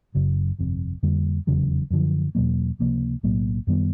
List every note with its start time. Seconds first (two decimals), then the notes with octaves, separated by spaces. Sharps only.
0.15 F#1 F#2 C#3 F#3
0.59 G1 F2 C3
1.03 F2 D3 G3 A#3
1.47 F1 E2 C#3 F#3
1.91 F#2 D3 F3
2.35 E2 B2 F#3 A#3
2.79 C#2 C3 F3 A#3
3.23 B1 A2 F#3 A#3
3.67 F#2 D#3 G3 B3